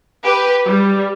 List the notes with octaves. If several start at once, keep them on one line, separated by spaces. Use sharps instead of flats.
G4 B4
G3